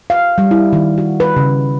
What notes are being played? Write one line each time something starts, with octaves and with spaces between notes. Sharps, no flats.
F5
G3
E4
D#3
F#4
B4
C#3